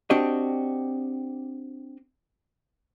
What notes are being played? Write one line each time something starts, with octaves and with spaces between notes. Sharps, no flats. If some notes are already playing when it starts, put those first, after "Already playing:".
C4 D4 F#4 G4 D#5